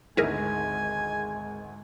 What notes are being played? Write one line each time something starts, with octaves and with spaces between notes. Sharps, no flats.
G#1 D2 G#3 E4 G#4 A#4 G#5